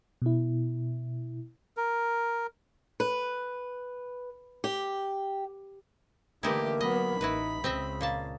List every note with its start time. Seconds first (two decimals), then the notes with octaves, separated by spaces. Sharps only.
0.22 B2 E4
1.77 A#4
3.00 B4
4.64 G4
6.43 D3 E3 A3 A#3 D#4 E4 G4
6.81 F#3 B3 D#5 B5
7.21 A1 D#4 E4 F#4 B4
7.64 C#2 C#3 C4 D#5 E5
8.01 A#2 A#3 F5 A5